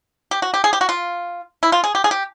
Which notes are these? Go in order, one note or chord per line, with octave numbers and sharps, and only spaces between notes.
G4
F#4
G4
G#4
G4
F#4
F4
E4
F4
G#4
G4
G#4
G4